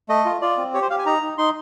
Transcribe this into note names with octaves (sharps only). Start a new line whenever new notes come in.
A3 D#5
F4
F4 D5
C4
G4 C#5
C5
G4 F5
G#5
D#4 A#5
D#4
D#4 C6